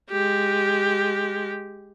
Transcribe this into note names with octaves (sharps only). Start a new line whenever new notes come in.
G#3 G4